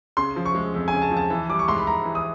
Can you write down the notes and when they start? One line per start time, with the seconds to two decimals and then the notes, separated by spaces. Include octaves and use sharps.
0.17 C#3 C6
0.36 F3
0.45 C#6
0.55 G#3
0.74 F2
0.88 C#3 G#5
1.02 A5
1.11 F3
1.17 A5
1.30 E3
1.49 G3 D6
1.59 C#6
1.68 G#2 C6
1.78 B5
1.87 G#2 A#5
2.05 E3
2.15 D#6